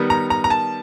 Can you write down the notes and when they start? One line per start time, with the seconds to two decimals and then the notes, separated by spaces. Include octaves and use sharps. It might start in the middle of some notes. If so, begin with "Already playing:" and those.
Already playing: D#3 G3 B3
0.10 A#5
0.30 A#5
0.44 A#5
0.50 A5